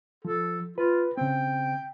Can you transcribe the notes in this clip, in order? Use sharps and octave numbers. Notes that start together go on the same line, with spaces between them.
F3 A4
F4 B4
C#3 C4 G5